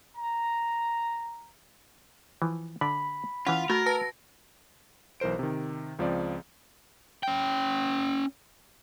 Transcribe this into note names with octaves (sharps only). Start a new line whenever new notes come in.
A#5
E3 F3
D3 D5 E5 B5
E3 C#4 F4 F#5
A3 F#4 A#4
B4 A5 A#6
B1 E3 A#4 C5 D7
C3 D#3
C#2 F3 C4 D5
C#4 G5